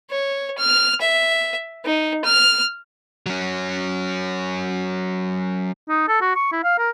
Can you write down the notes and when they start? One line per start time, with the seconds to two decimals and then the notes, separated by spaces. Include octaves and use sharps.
0.11 C#5
0.58 F6
1.01 E5
1.85 D#4
2.25 F6
3.26 F#3 C#4
5.89 D#4
6.08 A4
6.21 F#4
6.36 C#6
6.52 E4
6.64 F5
6.78 A#4